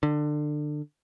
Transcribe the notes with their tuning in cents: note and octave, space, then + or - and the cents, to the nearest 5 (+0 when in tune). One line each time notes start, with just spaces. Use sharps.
D3 +25